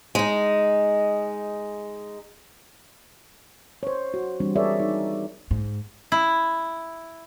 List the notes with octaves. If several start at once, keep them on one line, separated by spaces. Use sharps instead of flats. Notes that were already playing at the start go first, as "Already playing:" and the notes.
G#3 D#4
C5 C#5
F#4
E3 G3 C4 D4
G#4 A#4 C#5 D5 E5
D#4
G#2
E4